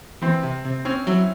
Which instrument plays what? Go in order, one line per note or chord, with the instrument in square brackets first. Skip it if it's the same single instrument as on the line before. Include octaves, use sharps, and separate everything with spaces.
[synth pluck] E3 [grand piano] C4
[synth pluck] C3
C3
[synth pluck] C4 [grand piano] C#4
[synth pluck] F#3 [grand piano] E4